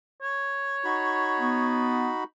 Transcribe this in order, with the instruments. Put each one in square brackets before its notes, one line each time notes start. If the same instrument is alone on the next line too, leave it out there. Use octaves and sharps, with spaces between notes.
[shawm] C#5
[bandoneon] D#4 F#4 B5
[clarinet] B3